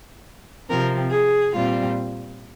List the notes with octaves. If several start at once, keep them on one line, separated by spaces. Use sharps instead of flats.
C3 F3 C4 A#4
G#4
A#2 G3 C4 F4